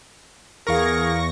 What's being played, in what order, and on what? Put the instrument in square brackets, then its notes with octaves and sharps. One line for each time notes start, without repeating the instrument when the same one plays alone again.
[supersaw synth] E2 C#6 A#6 [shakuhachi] G#4 [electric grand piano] A#4 F5